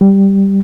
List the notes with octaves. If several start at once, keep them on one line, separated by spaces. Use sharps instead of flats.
G3